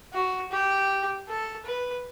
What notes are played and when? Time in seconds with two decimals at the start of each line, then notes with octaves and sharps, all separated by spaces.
0.13 F#4
0.51 G4
1.28 A4
1.66 B4